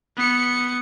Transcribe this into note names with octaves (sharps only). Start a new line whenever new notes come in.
B3 C#7